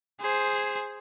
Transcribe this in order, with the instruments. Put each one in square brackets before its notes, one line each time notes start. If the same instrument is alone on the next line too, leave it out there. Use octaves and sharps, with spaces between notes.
[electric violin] G#4 C5